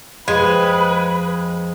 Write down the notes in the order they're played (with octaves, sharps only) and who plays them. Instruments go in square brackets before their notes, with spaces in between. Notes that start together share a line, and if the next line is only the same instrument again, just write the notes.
[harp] F2 [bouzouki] G#3 [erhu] B4